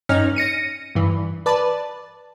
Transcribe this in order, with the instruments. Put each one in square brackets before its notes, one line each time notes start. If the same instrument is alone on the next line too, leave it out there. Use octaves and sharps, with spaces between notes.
[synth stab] G2 C#4 D#4 F6
A#6 C#7 D#7
G2 E3
B4 D5 A5